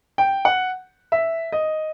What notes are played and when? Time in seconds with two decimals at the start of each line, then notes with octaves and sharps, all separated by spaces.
0.18 G5
0.45 F#5
1.12 E5
1.52 D#5